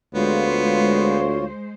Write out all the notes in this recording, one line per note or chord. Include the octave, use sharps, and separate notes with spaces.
D2 G#3 B3 F4 C5 C#5